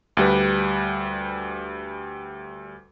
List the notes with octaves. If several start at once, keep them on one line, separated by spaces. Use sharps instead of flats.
D2 G3 B4